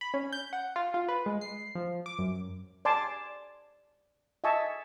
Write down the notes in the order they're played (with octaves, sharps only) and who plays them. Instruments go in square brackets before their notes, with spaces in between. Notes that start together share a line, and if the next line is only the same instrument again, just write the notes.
[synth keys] B5
C#4
G6
F#5
F4
F4
B4
G#3
C7
F3
D6
F#2
[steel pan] D5 G#5 A5 C6 D6
D#5 E5 G#5 A5 C#6